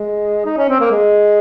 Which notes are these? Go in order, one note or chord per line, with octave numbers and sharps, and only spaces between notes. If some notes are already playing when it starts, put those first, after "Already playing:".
Already playing: G#3
D#4
C#4
C4
A#3
G#3